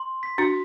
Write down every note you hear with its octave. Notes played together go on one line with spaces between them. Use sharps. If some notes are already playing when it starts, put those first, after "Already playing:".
Already playing: C6
B6
D4 F#4